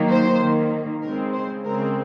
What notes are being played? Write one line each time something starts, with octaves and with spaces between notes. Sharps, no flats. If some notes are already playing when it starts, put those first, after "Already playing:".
Already playing: D#3 F#3 A#3
C5
D#3 A#3
C#3 G#3 C4 A#4
C5
C#3 G#3 C4 A#4